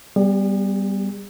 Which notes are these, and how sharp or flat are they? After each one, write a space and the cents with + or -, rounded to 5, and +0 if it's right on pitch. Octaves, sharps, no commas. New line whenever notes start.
G3 +0 B3 +0 G#4 -45